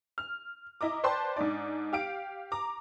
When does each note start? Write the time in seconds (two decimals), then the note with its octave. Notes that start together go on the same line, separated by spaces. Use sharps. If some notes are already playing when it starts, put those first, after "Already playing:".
0.18 F6
0.81 E4 D#5 A#5 D6
1.04 B4 C5 D5 G5 A5 C6
1.36 G#2 D4 D#4 D5
1.93 G4 F5 D7
2.52 A#5 D6